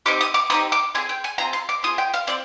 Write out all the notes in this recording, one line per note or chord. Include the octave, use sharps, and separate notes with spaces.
C4 D#4 G4 D6
D#6
D6
C4 D#4 G4 D#6
D6
C4 F4 G#4 G#5
G5
G#5
C4 F4 G#4 A#5
C6
D6
C4 F4 G#4 D#6
G5
F5
C4 F4 D5